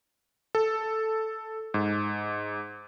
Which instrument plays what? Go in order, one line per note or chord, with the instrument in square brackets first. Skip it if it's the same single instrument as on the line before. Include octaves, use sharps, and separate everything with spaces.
[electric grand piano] A4
G#2